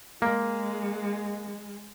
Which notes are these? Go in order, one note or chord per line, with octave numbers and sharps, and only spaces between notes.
G#3 A#3